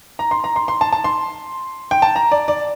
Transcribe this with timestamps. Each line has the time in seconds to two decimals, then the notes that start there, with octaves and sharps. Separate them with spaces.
0.19 A#5
0.31 C6
0.44 A#5
0.56 C6
0.68 C6
0.81 A5
0.93 A5
1.04 C6
1.91 G5
2.02 A5
2.16 A#5
2.32 D5
2.48 D5